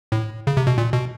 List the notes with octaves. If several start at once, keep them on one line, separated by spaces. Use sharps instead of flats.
A2
C#3
C3
B2
A#2
B2